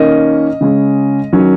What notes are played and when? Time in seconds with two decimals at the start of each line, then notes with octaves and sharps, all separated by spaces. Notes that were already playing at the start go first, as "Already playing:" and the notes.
Already playing: D#3 A#3 C#4 D#5
0.61 C#3 G#3 C#4
1.33 D#3 F#3 C#4